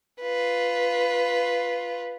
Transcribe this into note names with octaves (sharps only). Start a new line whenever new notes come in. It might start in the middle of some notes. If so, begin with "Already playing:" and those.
F4 B4